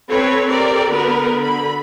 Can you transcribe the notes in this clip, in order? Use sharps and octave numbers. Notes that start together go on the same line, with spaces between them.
C4 A4 B4 C#5
C4 G4 A4 A#4 D5
D3 B3 F#4 A#4 B4
D3 B5